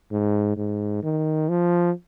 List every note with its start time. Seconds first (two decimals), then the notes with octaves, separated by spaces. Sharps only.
0.12 G#2
0.57 G#2
1.03 D#3
1.49 F3